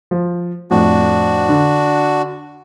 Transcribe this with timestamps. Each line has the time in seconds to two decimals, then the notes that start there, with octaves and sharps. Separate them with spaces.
0.11 F3
0.71 F2 A2 D4 F#4
1.49 D3